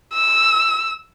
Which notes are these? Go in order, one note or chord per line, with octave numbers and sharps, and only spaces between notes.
E6